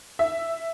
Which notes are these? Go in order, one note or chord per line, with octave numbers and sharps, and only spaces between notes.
E5